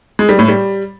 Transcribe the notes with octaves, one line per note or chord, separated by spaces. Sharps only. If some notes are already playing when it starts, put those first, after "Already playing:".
G#3
G3
A2
G3